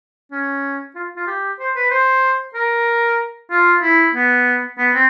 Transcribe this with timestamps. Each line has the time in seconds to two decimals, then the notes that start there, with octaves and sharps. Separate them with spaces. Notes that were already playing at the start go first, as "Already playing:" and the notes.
0.32 C#4
0.95 F4
1.16 F4
1.27 G4
1.59 C5
1.75 B4
1.90 C5
2.55 A#4
3.51 F4
3.82 E4
4.14 B3
4.78 B3
4.94 C4